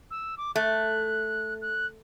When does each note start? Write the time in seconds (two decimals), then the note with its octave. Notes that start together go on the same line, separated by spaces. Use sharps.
0.11 E6
0.38 D6
0.56 A3 F#6
1.62 F#6